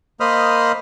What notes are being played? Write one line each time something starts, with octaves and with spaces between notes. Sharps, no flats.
A#3 C5 D#5 B5 D#6 F6